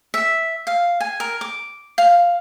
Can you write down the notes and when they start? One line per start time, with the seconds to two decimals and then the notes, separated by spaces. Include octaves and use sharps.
0.14 E5
0.67 F5
1.00 G#5
1.20 A#4
1.41 D6
1.98 F5